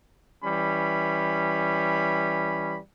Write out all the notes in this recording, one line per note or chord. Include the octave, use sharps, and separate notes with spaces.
E3 G3 C#4 B5